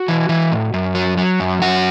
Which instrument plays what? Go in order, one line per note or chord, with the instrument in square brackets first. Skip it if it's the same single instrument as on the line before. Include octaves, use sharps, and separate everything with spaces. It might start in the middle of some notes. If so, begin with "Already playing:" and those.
Already playing: [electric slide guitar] F#4
E3
E3
A2
F#2
F#3
F#3
F#2
F#2 F#4